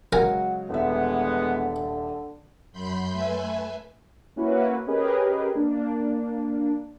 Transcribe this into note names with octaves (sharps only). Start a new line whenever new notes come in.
C#3 F#3 G#3 F#4 A#4 G#5 A#5
D#1 D3 E3 G#3 B3 E5
F#2 B5 C6 G6
A3 B4 E5 G#5
A#3 C#4 E4 F#4 B4
C#4 G4 G#4 A#4 B4 D#5
A#3 D4